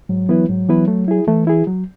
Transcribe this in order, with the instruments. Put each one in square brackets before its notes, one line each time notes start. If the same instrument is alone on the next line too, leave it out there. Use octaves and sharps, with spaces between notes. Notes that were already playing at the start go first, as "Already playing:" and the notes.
[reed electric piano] G#2 [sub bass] F#3
[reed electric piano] E3 B3 E4 B4
[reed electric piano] G#2 [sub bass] F#3
[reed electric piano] E3 B3 E4 B4
A3
E4 G#4
[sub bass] E3 [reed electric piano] A3
[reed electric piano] E4 G#4
F#3